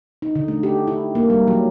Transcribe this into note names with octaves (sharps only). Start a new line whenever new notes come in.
D#4
D3
A3
G4
E4
A#3
G3
F#3